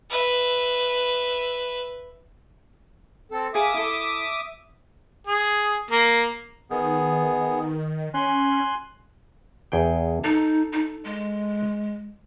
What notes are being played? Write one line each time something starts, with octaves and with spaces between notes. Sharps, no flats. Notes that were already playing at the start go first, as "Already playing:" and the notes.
B4 E5
C4 A4
G#4 A#4 E5 F5 D6 D#6
E4 A4
G#4
A#3
D#3 B3 G#4
C#4 G#5 C6 F#6
E2 G#4 G5
D#4 A4
D#4
G#3